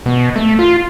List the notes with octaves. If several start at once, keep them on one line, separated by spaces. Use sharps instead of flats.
B2
A3
F4